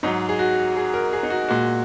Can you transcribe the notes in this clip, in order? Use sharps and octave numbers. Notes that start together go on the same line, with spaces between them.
G#2 F#3 D#4
G#4
F#4
G#4
A#4
G#4
D#4
F#4
A#2 G#3 F#4